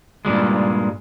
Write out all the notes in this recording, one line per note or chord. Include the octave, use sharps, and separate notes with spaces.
G2 A#2 G3 G#3